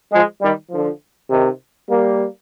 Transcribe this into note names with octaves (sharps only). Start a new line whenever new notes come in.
F3 G#3
D#3 G3
D3 F3
C3 D#3
G3 A#3